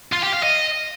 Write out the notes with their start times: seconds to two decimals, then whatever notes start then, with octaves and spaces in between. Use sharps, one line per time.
0.12 F4
0.22 G4
0.33 F5
0.43 D#5